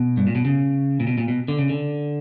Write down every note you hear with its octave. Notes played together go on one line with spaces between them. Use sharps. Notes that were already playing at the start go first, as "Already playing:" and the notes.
Already playing: B2
G2
A#2
B2
C#3
A#2
B2
A#2
B2
D3
C#3
D3